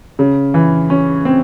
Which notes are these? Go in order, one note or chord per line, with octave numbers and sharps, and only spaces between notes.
C#3
E3
C#4
C4